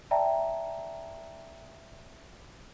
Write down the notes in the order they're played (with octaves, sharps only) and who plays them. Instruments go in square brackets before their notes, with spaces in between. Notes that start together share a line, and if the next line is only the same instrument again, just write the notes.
[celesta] D5 E5 G5 A5 A#5